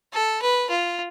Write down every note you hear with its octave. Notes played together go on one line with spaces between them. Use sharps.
A4
B4
F4